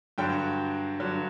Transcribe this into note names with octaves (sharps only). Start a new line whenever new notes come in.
G2 D3 F#3 G5
G2 D3 F#3